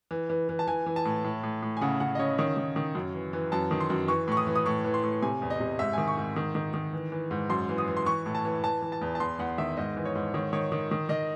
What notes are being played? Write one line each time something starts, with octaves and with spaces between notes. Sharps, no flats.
E3
E3
E3
A5
E3 G#5
E3
A5
A2
A2
A2
A2
G#5
C#3 F#5
C#3 F#5
D#5
C#3 C#5
D#3 C#5
D#3
D#3
F#2
E3
E3
F#2 A5
D#3
C6
F#2
E3 C#6
A2 C#6
D#6
E3
D#6
A2 C#6
E3
C6
A2
C3 G#5
E2
D#5
C3
G#2 E5
D#3 G#5
C#6
G#2
D#3
D#3
D#3
E3
E3
G#2
F#2 C6
E3
D#6
E3
C6
E3 C#6
A2
A5
E3
E3 A5
E3
A5
E2
A5
E2 C6
E2 F#5
D#3 E5
G#2 D#5
E3
C#5
G#2
D#3 C#5
D#3 C#5
D#3
D#3
D#3 D#5